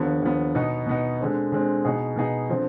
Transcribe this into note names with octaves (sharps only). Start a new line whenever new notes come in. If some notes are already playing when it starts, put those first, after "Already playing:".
Already playing: D#2 D3 F3 B3
D#2 D3 F3 B3
B2 B3 D#4
B2 B3 D#4
D3 G#3 C4
D3 G#3 C4
B2 B3 D#4 G#4
B2 B3 D#4 G#4
D3 F3 C4